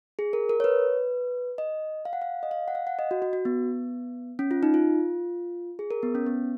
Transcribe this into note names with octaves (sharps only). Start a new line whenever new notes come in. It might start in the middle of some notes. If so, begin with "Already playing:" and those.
G#4
A#4
A#4
C#5
B4
D#5
F5
F#5
F5
D#5
F5
F#5
F5
F#5
D#5
F#4
F#4
F#4
B3
C#4
F4
D#4
F4
G#4
A#4
B3
C#4
B3